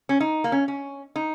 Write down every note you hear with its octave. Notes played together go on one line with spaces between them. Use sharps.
C#4
D#4
A#3
C#4
C#4
D#4